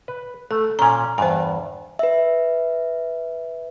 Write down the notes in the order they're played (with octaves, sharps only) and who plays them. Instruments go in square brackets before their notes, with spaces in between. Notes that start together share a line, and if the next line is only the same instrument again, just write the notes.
[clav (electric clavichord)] B4
[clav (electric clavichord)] A3 [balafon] A4
[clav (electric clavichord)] A#2 C#4 [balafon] G#5 A#5
[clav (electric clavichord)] E2 G2 [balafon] C5 G#5
[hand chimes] B4 E5